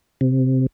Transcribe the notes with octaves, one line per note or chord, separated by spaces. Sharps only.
C3